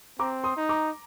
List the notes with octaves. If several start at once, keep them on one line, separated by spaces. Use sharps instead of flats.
C4 A#5 D6
C6 D#6
D#4
A#5 D6